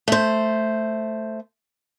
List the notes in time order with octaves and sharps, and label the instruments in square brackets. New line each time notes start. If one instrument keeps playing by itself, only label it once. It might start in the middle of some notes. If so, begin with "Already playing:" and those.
[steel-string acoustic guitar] A3 C5